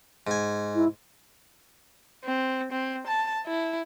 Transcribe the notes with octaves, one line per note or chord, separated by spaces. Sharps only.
G#2 G#5
E4
C4
C4
A5
E4